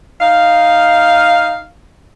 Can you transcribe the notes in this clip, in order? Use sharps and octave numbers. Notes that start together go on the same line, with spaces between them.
D#4 F5